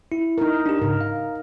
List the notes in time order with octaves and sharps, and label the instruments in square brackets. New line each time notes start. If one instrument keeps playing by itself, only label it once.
[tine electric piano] E4
[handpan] D#4 A#4
[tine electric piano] D4 G4
[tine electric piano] G#2 C#3 [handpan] A#4
[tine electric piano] F5